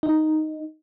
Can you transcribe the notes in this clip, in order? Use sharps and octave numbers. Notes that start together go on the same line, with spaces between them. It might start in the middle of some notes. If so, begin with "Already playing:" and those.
D#4